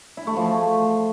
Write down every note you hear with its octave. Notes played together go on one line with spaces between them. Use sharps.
E4
A3
F3